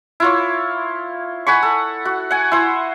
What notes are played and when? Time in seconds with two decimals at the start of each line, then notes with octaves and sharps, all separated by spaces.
0.20 E4 F4 C#5
1.47 F#5 G#5 B5 C#6
1.63 A4
2.05 F#4
2.31 F#5 G#5
2.52 E4 C5